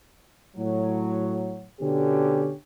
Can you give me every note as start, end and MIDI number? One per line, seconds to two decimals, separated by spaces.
0.57 1.65 45
0.57 1.65 54
1.80 2.53 47
1.80 2.53 50
1.80 2.53 61
1.80 2.53 67